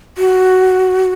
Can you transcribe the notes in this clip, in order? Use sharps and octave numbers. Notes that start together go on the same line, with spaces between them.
F#4